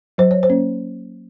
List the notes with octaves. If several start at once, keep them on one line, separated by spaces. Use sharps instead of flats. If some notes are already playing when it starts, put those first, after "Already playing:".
F#3 C5
C#5
C5
A#3 C#4